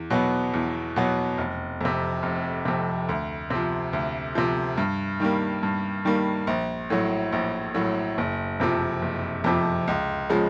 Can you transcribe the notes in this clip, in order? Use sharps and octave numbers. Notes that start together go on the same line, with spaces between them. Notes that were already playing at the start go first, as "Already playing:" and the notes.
Already playing: E2
B2 F#3 B3
E2
B2 F#3 B3
F1
F2 C3
F1
F2 C3
D2
C3 F3
D2
C3 F3
G2
D#3 G3 A#3
G2
D#3 G3 A#3
A#1
A2 F#3
A#1
A2 F#3
F#1
F2 C3 F3
F#1
F2 C3 F3
C#2
C#3 F3 G#3